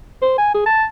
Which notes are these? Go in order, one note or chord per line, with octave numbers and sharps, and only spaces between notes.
C5
G#5
G#4
A5